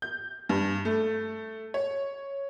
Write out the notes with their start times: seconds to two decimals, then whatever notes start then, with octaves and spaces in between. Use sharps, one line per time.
0.02 G6
0.49 G2
0.85 A3
1.74 C#5